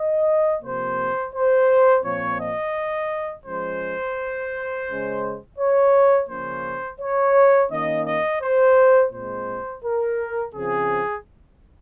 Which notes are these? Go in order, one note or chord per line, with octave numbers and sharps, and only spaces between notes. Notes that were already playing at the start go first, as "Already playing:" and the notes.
Already playing: D#5
C3 F3 A#3 C5
C5
A#2 F3 C4 C#5
D#5
F3 G#3 C#4 C5
C#3 G#3 C#4
C#5
C#3 F3 A#3 C#4 C5
C#5
D#3 A#3 C#4 D#5
D#5
C5
A#2 G#3 C4 C5
A#4
C#3 F3 C4 G#4